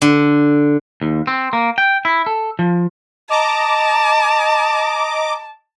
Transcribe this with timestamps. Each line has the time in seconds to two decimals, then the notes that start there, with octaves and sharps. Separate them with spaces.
0.02 D3
1.02 D#2
1.27 C4
1.53 A#3
1.78 G5
2.05 E4
2.26 A4
2.59 F3
3.29 D#5 A5 A#5 D6